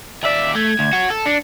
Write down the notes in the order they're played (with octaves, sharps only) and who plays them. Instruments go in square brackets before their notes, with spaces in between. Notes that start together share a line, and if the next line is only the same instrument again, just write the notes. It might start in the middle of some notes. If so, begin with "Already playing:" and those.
[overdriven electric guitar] D#2 D5 [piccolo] E5
[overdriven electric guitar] A3 [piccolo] G#6
[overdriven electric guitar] D2
F#4 C#5
A4
[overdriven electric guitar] D4 [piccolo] C#7